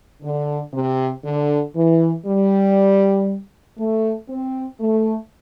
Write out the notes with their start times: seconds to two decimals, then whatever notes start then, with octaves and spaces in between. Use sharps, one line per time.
0.23 D3
0.74 C3
1.24 D3
1.76 E3
2.26 G3
3.78 A3
4.29 C4
4.80 A3